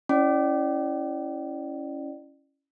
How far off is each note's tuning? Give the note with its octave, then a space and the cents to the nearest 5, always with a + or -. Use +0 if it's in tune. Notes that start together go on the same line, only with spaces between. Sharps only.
C#4 +0 E4 +0 D5 +35